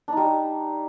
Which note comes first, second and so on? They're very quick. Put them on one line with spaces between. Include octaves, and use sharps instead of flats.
D4 D#4 G3